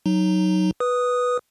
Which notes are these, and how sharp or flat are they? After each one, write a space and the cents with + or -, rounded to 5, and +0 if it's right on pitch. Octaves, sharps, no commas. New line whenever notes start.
F#3 +0 D#4 +0
B4 -5 D#6 +0